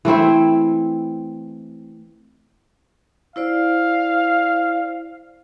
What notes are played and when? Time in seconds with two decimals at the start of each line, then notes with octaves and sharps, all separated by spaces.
0.05 E3 A3 C4 E4
3.36 E4 C5 D5 F5